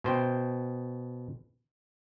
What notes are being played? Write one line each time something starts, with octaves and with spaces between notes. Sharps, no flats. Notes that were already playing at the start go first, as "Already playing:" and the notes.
B2 C5 G5